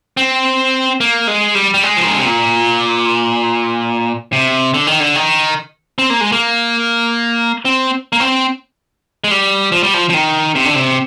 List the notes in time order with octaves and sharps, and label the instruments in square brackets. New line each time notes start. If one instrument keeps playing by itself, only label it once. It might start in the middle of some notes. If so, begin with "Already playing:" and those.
[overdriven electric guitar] C4
A#3
G#3
G3
G3
G#3
F3
D#3
D3
C3
A#2
C3
D3
D#3
D3
D#3
C4
A#3
G#3
A#3
C4
A#3
C4
G#3
G3
F3
G3
F3
F3
D#3
C3
D3
C3